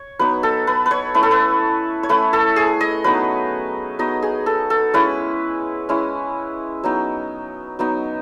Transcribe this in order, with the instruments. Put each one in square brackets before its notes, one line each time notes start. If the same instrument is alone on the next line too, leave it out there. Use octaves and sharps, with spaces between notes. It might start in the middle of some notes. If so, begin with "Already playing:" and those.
Already playing: [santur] C#5
F#3 B3 D#4 B4
A4
B4
B4
C#5
A3 C#4 E4 B4
A4
B4
C#5
A3 C#4 E4 B4
A4
G#4
D#5
F#3 B3 D#4 B4
F#3 B3 D#4 D#5
G#4
A4
A4
G#3 C#4 E4 B4
G#3 C#4 E4
F#3 B3 D#4
F#3 B3 D#4